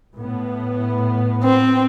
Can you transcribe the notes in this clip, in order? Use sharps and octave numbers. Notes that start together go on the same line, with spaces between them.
A2 B3
C4